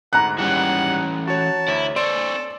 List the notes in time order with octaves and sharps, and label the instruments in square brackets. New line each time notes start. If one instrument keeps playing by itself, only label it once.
[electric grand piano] D2 G#2 [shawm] F#5 [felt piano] A#5 F#6
[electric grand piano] D#2 G#2 G3 [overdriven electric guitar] E3 C#4 [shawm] F#5
[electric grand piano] F#4 C#5 [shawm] A5
[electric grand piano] D2 C#5 [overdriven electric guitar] E4
[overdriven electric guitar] C4 C#5 [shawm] A4 [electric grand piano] D5 C6 D7